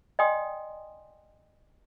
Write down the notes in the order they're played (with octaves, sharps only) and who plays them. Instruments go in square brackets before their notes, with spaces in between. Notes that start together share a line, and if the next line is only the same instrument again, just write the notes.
[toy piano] D5 D#5 G5 G#5 C6 D#6